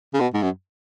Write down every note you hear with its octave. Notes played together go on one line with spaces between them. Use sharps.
C#3
B2
G#2
F#2